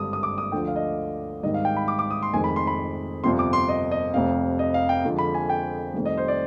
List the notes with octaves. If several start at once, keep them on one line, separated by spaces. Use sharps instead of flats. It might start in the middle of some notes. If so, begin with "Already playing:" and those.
Already playing: G#1 G2 D3 D#6
D#6
D6
D#6
D2 D3 F3 G5
F5
D#5
G#1 G#2 D#3 G3 D#5
F5
G5
B5
D6
D6
D#6
C6
F1 F2 D#3 G#3 G#5
B5
C6
B5
G1 F2 C3 F3 C6
D6
C6
D#5
D#5
F1 F2 C3 F5
D#5
F5
G5
F2 D3 F3 G#3
B5
G#5
G5
F1 F2 D#3 G3
D#5
C5
D5